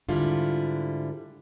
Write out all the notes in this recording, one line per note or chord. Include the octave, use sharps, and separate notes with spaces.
G#2 D3 G3 E4 F4